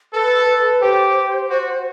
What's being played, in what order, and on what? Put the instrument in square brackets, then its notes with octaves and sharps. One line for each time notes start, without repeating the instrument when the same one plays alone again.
[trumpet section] A4 [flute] B4
[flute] B4
[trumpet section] G4 [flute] C5
[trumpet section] F#4